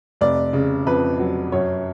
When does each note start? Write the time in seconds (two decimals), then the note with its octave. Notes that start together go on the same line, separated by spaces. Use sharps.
0.21 F1 D5
0.53 C#3
0.86 F2 B4
1.19 F#3
1.52 F#2 C#5